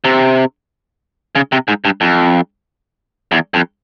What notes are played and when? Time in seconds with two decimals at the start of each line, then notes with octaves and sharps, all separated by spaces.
0.05 C3
1.35 C#3
1.52 C3
1.68 G#2
1.85 G2
2.01 F2
3.32 E2
3.54 F2